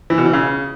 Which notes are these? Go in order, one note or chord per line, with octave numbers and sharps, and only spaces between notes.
E3
B2
E3
C#3